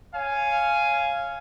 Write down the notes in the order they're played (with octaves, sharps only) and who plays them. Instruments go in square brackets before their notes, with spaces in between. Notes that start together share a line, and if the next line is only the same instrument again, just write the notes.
[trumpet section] C#5 F5 G#5